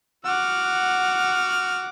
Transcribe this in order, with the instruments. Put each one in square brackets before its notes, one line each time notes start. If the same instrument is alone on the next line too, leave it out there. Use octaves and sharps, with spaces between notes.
[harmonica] F#4 F6 [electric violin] F#5 D6